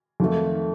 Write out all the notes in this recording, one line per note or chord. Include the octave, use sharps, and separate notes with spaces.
F2 D#3 A3